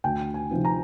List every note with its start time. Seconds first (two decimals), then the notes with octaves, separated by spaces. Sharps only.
0.04 D2 G5
0.34 G#5
0.50 C3 F3 C4 D#4
0.65 A#5